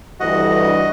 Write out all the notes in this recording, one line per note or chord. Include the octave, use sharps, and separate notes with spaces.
D2 G2 E3 F#4 D#5